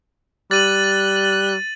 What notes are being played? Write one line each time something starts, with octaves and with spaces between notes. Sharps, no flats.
G3 F#6 A6 D#7 F#7